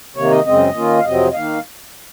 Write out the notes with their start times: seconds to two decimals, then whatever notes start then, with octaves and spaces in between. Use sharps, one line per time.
0.16 C3 D#3 A#3 C#5
0.31 D#5
0.46 F#2 C#3 G#3 C4 D#5
0.75 D#3 A#3 C#4 F4
0.99 F5
1.05 F2 C3 F#3 C4 D#5
1.30 D#5
1.34 D#3 A#3 F5